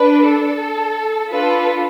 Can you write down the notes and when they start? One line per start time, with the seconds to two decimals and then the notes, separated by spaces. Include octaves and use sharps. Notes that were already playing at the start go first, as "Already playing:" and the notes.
Already playing: D4 B4
0.26 A4
1.30 D4 F4 A4 B4